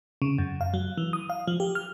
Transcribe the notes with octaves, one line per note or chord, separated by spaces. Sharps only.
C#3
F#2
F5
F#3
E3
D#6
F5
F3
G4
F6